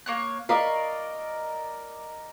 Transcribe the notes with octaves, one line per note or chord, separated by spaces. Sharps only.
A#3 C#5 F#6
A#4 D5 D#5 F5 B5 C#6